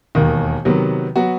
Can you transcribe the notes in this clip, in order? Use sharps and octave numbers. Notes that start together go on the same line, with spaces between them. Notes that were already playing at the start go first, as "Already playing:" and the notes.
E1 D#2 D#3
C3 D#3 F#3 B3
F#3 B3 F#4